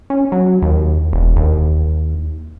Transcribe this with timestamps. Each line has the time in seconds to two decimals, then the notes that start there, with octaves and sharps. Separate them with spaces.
0.10 C#4
0.32 F#3
0.62 D#2
1.13 E1
1.36 D#2